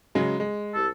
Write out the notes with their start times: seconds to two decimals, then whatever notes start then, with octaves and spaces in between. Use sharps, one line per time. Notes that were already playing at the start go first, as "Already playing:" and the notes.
0.15 C#3 F#3 G#3
0.40 G#3
0.74 C2 G4 A4